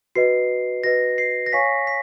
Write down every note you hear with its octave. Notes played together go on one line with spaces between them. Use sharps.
F#4 B4 D#5 C7
F#4 B4 D#5 A#6
C7
A#6
C#5 F5 G#5 C#6 B6
B6